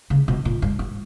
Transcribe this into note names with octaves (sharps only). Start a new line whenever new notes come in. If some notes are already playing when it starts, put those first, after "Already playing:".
C#3
B2
A#2
G2
G2